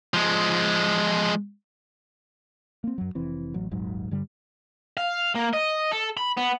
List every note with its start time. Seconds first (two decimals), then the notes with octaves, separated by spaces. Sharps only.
0.14 F3 G#3
2.84 A#3 C4
2.98 F#2 F#3
3.15 F1 E3 C4
3.54 A1 F#3
3.71 D#1 G#1 G#2 F#3
4.11 G2 D3 G3
4.97 F5
5.35 A#3
5.53 D#5
5.92 A4
6.17 B5
6.37 B3